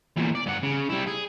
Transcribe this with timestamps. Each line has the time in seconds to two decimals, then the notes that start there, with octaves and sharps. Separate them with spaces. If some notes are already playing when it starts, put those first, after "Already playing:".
0.17 E2 A#2
0.35 D5
0.46 G2 F#5
0.63 C#3
0.89 G3 E4
1.07 G#4